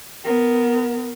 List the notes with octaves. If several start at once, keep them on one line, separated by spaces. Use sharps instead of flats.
B3 A#4